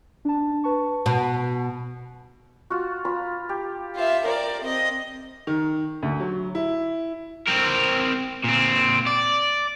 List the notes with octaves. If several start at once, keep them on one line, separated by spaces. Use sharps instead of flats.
D4 A5
B4 A5 C#6
B2 A5
F4 F#4
F4 A#5 B5
G4
F4 E5
A#4 C5 D5 A#5
C4 D#5
D#3
D2
F#3
E4
C4 A#4
A#2 C4
D5